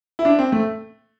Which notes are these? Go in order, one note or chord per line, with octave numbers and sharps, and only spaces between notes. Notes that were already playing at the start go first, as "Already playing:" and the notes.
E4
D4
C4
A3